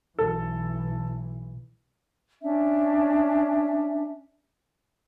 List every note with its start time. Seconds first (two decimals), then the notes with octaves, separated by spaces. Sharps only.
0.19 B1 E3 A4
2.42 C#4 D4 E5